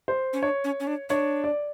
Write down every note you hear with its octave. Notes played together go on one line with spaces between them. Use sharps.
C5
C#4
D4 C#5
C#4
C#4
D4
D4 C#5
D5